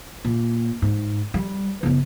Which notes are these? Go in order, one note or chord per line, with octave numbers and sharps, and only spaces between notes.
A#2
G#2
G3
F#1 B3